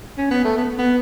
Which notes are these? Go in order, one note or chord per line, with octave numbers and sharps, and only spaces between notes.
C#4
B3
A3
B3
B3